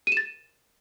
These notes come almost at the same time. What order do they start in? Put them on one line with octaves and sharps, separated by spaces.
D#7 E7 A6